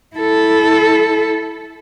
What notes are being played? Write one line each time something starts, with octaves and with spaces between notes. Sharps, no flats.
E4 A4